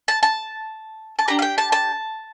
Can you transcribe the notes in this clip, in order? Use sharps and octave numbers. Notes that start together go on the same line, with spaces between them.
A5
A5
A5
D4 G4 A#5
F5
G5
A5
A5